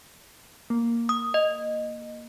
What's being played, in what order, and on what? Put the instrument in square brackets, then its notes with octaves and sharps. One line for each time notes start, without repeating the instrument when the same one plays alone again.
[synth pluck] A#3
[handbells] D#6
D#5